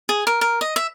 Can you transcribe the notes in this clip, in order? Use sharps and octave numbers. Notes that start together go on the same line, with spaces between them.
G#4
A#4
A#4
D#5
E5